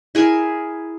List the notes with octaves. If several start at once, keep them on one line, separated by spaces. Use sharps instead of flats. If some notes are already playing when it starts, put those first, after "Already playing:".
E4 G#4 A#4 G#5